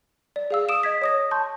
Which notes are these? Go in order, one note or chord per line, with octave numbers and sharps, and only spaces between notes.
D5
G#4 F5 E6
D#6 D7 E7
D#5 G#6 B6
C#5 D#6 A#6
A5 C6 C#6 G6